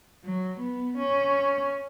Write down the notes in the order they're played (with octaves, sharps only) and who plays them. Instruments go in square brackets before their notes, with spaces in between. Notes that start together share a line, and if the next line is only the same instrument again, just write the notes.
[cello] F#3
B3
C#4